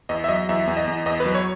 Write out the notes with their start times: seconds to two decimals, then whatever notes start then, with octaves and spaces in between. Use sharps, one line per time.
0.09 E2 D#5
0.24 E5
0.28 F#3 D#5
0.49 E2 E5
0.67 E2
0.77 D#5
0.88 E2
1.06 E2 D#5
1.20 B4
1.26 F#3
1.35 C#5